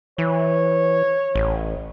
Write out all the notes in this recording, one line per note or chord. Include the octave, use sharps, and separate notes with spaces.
E3 C#5
A1